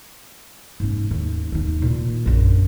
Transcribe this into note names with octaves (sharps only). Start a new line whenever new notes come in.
G#2 C#4
D#2
D#2 D#4
A#2
A#1 F#2